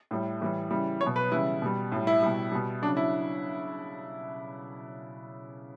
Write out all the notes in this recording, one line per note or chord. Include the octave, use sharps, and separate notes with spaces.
A2 G3
A2 E3 G3
C#3 E3 G3
F#3 C#5
B2
B4
C#3 E3 G3 E4
B2 G3
A2 G3
E4
B2 G3
B2 G3
C#3 F#3 D4
E4